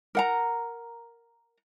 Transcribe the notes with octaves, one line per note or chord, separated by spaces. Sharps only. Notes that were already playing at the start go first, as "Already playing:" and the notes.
A#4 F#5 A#5